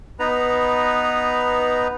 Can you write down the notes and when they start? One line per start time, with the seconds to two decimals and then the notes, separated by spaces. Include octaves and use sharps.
0.19 B3 D#4 B4 A#5